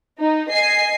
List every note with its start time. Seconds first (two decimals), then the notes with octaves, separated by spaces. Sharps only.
0.18 D#4
0.50 D#5 G#5 C7